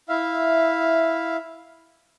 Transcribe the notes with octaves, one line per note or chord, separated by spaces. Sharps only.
E4 E5 F5